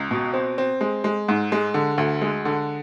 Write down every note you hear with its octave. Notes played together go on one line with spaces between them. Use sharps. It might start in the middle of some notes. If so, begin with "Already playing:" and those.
Already playing: C#2
B2
C4
C4
G#3
G#3
G#2
G#3
D3
D2
G#3
D3